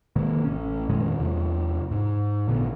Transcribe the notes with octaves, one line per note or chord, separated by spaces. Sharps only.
C3 D#3 G#3 A#3
A1 C#4
F2 A#2 D#3 G#3
E2 C3
G#2
A1 A#2 D3 B3